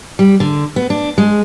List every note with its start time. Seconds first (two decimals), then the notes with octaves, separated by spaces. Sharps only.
0.19 G3
0.40 D3
0.76 B3
0.90 D4
1.18 G#3